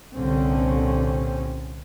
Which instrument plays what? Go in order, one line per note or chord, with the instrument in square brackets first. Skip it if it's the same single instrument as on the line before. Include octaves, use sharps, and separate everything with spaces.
[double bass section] C2 A#2 D3 C4 C#4